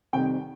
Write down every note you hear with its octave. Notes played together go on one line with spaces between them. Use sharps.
F2 C3 D#3 G3 G5